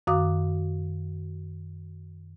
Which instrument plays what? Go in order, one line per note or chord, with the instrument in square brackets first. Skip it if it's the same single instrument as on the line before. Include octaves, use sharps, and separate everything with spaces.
[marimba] F#2 D#3 F#4 F5 D6 D#6